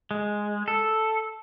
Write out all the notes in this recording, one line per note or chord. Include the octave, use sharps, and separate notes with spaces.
G#3
A4